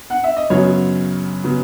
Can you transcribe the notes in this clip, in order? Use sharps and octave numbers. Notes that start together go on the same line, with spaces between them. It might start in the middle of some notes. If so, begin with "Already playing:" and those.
F#5
E5
D#5
F#2 C#3 F#3 B3 C#5
C#3 F#3 B3